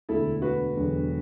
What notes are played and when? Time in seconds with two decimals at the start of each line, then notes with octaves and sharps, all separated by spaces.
0.09 E1 D2 D3 E4 A4
0.42 F#4 B4
0.76 E1 E2 D3 F#3